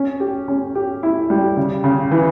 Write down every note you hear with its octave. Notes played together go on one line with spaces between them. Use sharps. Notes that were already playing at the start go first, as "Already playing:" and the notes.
Already playing: C#4
G4
C#4
G4
E4
G3
C#3
C#3
E3